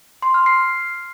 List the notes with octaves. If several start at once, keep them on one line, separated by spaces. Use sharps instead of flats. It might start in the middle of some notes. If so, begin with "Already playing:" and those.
C6
F6
C7